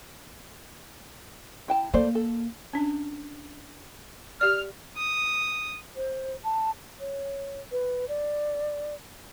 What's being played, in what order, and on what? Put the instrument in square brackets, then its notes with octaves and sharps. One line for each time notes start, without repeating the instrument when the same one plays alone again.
[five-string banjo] E4 G5 A5
[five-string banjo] A3 C5 D5 [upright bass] A#3
[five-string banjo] A4
[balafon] C#4 D4
[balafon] G4 D5 [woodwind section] F6
[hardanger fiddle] D#6
[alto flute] C5
A5
C#5
B4
D5